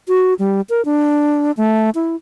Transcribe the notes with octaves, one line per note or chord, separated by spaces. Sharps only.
F#4
G3
A#4
D4
A3
E4